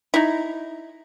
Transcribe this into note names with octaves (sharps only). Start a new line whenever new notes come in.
D#4 E4